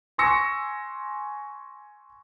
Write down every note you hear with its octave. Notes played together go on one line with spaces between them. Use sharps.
G#5 C6 C#6 E6 A#6 C#7